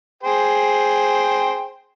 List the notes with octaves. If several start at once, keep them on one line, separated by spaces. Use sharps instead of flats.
G#4 C5 G5